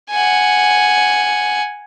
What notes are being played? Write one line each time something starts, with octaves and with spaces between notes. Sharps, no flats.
F#5 G#5